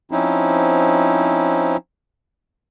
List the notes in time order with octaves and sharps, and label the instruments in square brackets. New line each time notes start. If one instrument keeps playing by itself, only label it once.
[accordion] F3 C4 C#4 D#4 E4